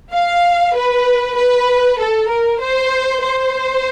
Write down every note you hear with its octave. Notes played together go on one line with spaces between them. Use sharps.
F5
B4
B4
A4
A#4
C5
C5